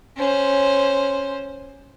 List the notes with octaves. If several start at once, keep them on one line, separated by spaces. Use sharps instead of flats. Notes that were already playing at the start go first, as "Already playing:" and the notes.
C#4 C5